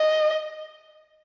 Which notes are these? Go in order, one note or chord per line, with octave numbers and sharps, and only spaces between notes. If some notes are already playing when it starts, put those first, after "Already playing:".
Already playing: D#5